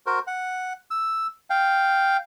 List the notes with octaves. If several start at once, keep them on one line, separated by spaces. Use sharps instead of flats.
F#4 A#4 C5
F#5
E6
F5 G5